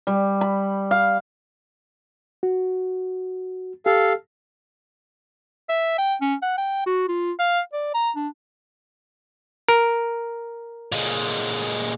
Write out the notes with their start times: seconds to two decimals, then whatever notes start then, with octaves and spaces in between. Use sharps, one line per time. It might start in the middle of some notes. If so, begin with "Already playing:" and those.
0.07 G3
0.41 B5
0.91 F5
2.43 F#4
3.86 G4 A4 F5
5.69 E5
5.98 G5
6.21 C#4
6.42 F#5
6.58 G5
6.86 F#4
7.08 F4
7.39 F5
7.73 D5
7.94 A#5
8.16 D4
9.69 A#4
10.92 A#2 G#3